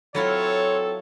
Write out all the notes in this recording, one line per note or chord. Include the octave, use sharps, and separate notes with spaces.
F#3 C4 E4 F4 A4 C#5